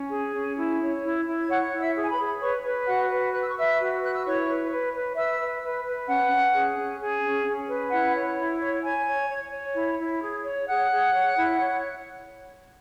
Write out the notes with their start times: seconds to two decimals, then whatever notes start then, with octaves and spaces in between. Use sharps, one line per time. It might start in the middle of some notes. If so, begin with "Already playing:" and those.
Already playing: C#4
0.12 G#4
0.35 C#4
0.57 E4
0.80 C#5
1.03 E4
1.26 E4
1.40 G#6
1.49 C#5 F#5 F#6
1.72 E4
1.79 E5 E6
1.95 G#4
2.04 G#5
2.10 B4 B5
2.18 G#4
2.40 B4 C#5 C#6
2.64 B4
2.86 F#4 F#5 F#6
3.10 B4
3.32 B4 F#6
3.41 E6
3.50 C#6
3.56 B4 E5 E6
3.79 F#4
4.01 B4 F#6
4.14 E6
4.24 E4 C#5 C#6
4.48 B4
4.70 B4
4.94 B4
5.16 B4 E5 E6
5.40 B4
5.62 B4
5.85 B4
6.08 C#4 F#5 F#6
6.31 C#4
6.54 G#4
6.78 C#4
7.01 G#4
7.23 C#4
7.46 C#4
7.69 B4
7.92 E4 F#5 F#6
8.15 C#5
8.37 E4
8.60 C#5
8.84 C#5 G#5 G#6
9.07 C#5
9.29 C#5
9.52 C#5
9.75 E4
9.98 E4
10.22 G#4
10.44 C#5
10.67 G#4 F#5 F#6
10.91 G#4
11.14 C#5
11.37 E4
11.59 C#5